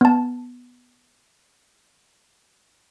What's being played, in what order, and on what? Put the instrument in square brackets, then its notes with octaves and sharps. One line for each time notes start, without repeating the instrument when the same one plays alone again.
[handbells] B3 A5